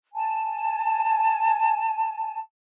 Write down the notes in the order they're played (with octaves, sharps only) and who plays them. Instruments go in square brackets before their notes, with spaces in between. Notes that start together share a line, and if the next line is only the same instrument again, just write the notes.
[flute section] G#5 A5